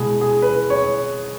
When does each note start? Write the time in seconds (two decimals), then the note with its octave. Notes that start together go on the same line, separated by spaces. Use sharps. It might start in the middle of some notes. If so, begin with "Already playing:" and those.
Already playing: B2 G#3 E4 G#4
0.21 G#4
0.42 B4
0.70 C#5